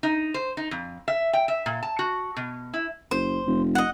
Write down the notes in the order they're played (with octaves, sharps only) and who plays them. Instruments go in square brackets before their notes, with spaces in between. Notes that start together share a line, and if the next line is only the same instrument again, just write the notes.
[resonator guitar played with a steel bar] D#4
C5
D#4
F2
E5
G5
E5
A#2
A5
F#4
B2
E4
[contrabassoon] F#1 [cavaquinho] C5
[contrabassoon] F1
[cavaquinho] D#5 F#5